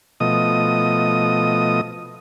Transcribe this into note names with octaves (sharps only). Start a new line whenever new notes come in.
B2 F3 A3 D#5 D#6